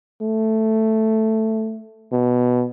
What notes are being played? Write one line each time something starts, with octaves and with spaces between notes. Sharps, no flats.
A3
B2